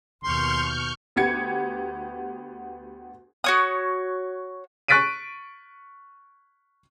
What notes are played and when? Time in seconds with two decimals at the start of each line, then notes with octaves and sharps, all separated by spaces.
0.23 D#2 B2 C6 C#6 F6 G6
1.16 D2 B3 G4 G#6 C#7
3.44 F#4 C#5 D#6
4.88 C#6 F#6 A6 B6 D7 D#7